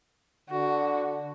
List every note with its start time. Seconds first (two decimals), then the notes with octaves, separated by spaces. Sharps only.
0.50 D3 F#4